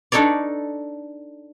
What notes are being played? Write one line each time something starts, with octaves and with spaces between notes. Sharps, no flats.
D4 D#4 A4 C#5 D5